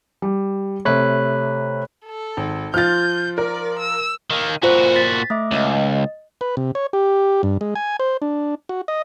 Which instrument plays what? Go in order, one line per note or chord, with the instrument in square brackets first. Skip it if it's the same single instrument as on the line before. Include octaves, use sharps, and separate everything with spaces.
[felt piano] G3
[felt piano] C3 A3 [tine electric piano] C#5 B5 F#6
[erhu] A4
[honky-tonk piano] G#1
[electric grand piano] F3 F4 [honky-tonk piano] F6 A6 [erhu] G6
[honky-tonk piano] A#4 [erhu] D5
[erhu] E6
[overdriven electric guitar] D#3 A#3
[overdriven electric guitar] A#2 F#4 [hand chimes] F4 C5
[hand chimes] A6 B6
A3 E5 D6
[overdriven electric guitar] C#2 [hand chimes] D#5
[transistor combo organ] B4
C3
C#5
G4
G2
G#3
G#5
C5
D4
F#4
D#5